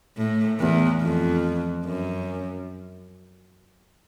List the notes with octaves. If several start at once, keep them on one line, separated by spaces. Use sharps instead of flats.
A2
E2
F2
F#2